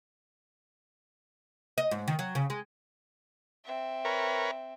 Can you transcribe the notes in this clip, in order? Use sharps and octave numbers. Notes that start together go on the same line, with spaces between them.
D#5
G#2
D#3
F#3
C#3
G#3
C4 E5
A#4 B4 C#5